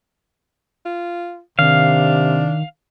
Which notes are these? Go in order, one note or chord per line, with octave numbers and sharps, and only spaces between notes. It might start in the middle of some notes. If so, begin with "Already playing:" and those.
F4
C3 D#3 D4 F5